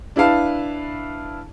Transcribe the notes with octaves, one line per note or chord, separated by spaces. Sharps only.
D4 E4 B4 F5 A5